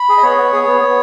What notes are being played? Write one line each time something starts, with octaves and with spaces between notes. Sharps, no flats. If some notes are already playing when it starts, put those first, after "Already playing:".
Already playing: B5
G#4
D#5
B3 C#5
B3
G#4
B3
B3